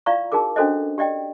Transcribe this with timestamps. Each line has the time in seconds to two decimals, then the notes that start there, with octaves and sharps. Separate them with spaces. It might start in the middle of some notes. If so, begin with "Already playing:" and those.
0.06 E4 F4 D5 F5 A#5 C#6
0.32 D#4 F#4 G#4 A#4 D6
0.56 C#4 D4 F#4 A4 C5 D#5
0.98 G4 D5 D#5 G5